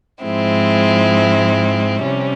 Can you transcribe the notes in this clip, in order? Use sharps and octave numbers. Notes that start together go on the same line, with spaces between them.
G#2 F3 G#3 C4 E4
C3 G3 C#4